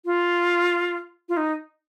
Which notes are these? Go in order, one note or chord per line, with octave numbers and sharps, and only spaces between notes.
F4
F4
D#4